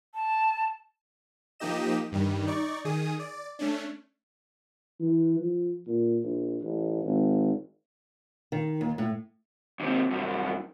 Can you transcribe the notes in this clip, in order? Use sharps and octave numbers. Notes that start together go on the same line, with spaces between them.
A5
F3 A#3 D#4 G4 D#5 E7
G2 D#3 G3
D#4 D5 C#6
D#3 G#4 D#6
D5
A3 C#4 D4
E3
F3
A#2
A#1
A1
G#1
D#3
D#2
A2
D#2 C3
C2 F#2